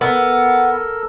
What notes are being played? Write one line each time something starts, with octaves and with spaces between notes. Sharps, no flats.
B3 A4 A#4